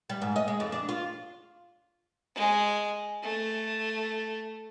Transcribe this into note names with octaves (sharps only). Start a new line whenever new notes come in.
G3
G#2
D#5
G#3
F2
D4
F4
G#3
A3